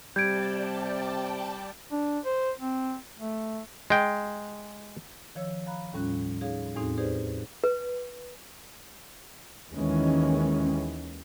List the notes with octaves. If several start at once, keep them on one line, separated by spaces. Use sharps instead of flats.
C3 G3 D5 G5 A5 G6 G#6 D7
D4
C5
C4
A3
G#3 G5
D#3 F3 C#5 E6
F5 A#5 B5 F#6
D#2 A2 G3 C#4 F4 F#6
D#4 G#4 C#5 F5
E2 A2 C4 D#4 F#4 G#4
D#4 G4 G#4 B4 C5 D5
B4
D#2 D#3 E3 G#3 C#4